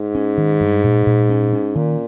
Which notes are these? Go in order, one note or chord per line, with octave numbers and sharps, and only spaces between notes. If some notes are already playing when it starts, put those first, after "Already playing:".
Already playing: G#2
C#4
D#3
G2
A#2
A#2
C#4
C#4
A#2 D#3